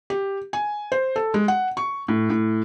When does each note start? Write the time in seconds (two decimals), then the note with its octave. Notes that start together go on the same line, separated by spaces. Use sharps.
0.10 G4
0.53 G#5
0.92 C5
1.16 A4
1.34 G#3
1.48 F#5
1.77 C#6
2.08 A2
2.30 A2